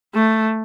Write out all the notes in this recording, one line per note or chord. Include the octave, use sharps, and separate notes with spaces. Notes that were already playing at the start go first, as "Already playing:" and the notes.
A3